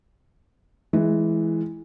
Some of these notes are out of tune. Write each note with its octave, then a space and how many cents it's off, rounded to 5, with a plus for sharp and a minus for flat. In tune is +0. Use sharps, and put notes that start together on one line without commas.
E3 -5 G#3 +15